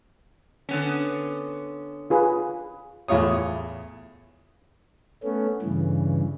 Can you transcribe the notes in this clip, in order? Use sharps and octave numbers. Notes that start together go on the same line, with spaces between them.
D3 B3 C#4
F4 G#4 B4
E2 A2 F4 C#5 D#6
A3 B3 C#4
G2 C#3 E3